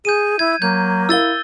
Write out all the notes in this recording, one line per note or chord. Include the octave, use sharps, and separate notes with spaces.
G#4 G6 D#7
E4 G#6
F#3 A#3 G6
E4 A#4 F5 E6 A6 G7